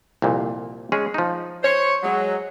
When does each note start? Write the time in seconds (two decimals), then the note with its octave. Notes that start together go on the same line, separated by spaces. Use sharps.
0.22 C2 F2 A#2
0.92 G#3 C#4 G#4
1.14 F3 D#4
1.63 C5 C#5
2.02 F#3 G#3